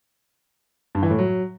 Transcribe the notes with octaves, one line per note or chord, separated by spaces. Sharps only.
G2
E3
A2
F#3